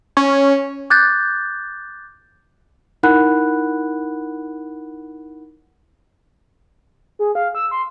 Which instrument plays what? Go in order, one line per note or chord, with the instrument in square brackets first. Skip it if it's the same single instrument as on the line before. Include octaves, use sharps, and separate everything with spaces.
[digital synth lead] C#4
[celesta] D6 F#6 G6 A6
D#4 E4 A#4 F#5 B5 F#6
[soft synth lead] G#4
F5
E6
C6